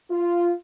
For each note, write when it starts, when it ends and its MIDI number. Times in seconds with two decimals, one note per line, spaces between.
0.11 0.53 65